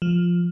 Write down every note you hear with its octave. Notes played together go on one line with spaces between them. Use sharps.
F3